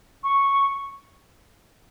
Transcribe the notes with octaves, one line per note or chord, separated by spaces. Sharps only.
C#6